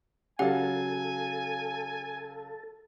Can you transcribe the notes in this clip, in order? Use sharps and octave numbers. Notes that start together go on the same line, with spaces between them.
C#3 F#3 C#4 G4 A4 F5 F#5 G#5